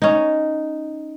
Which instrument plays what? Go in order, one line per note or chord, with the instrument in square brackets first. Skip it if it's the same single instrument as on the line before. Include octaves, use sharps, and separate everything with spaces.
[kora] C#4 D#4